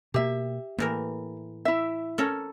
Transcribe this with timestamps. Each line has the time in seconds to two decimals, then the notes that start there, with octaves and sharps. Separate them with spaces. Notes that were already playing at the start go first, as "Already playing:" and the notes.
0.14 B2 A#3 G4 E5
0.78 A2 E3 A#3 A#4
1.65 E4 E5
2.18 C#4 A4 A#4